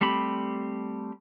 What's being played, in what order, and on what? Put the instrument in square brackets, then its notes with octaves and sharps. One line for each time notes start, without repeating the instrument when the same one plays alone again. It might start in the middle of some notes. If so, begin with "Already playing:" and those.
[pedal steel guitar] G3 A3 C4 G4 B5